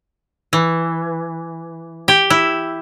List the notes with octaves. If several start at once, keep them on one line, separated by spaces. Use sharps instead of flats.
E3
G4
E4